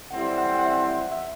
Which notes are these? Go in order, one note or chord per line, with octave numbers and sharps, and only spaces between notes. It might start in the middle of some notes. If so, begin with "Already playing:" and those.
A2 G3 C4 E4 F#5
F#5
F#5
E5
E5